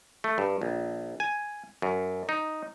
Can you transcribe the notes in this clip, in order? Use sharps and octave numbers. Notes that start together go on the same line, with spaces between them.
A3
G2
A#1
G#5
F#2
D#4